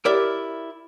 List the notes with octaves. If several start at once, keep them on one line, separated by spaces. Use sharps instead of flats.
E4 G4 A#4 D5 E5